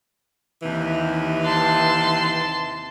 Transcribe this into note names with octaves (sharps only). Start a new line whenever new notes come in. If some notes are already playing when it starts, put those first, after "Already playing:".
D#2 C3 E3
A5 C6